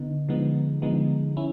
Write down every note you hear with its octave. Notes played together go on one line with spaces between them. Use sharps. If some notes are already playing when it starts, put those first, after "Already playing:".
Already playing: D3 B3 D#4
D3 F3 G#3 B3 D#4
D3 F3 G#3 B3 D#4
C#4 E4